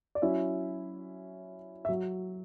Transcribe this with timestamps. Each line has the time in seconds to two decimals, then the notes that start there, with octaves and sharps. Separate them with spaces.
0.15 D5
0.22 F#3 C#4 E4 E5
1.85 E5
1.89 F#3